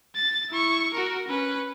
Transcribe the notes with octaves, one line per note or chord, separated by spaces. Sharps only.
A6
E4 C#6
F#4 A#4
C#4 B4